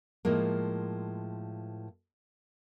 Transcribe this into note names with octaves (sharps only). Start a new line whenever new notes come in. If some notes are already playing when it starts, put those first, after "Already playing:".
A2 F3 G#3 A#3